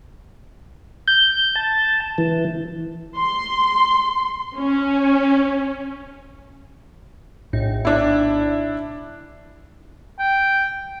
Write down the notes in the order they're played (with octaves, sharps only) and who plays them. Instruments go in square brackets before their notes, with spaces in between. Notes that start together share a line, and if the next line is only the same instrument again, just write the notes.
[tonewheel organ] G6
A5
E3
[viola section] C6
C#4
[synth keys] A#1 A2 D#4
[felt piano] D4 E4
[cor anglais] G5